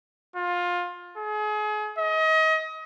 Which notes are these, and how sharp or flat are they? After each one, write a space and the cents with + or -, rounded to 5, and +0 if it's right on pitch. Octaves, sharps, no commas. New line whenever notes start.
F4 +20
G#4 +35
D#5 +30